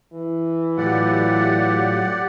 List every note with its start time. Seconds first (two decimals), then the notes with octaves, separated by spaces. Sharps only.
0.13 E3
0.77 A2 F#3 F4 G4 D5 F#5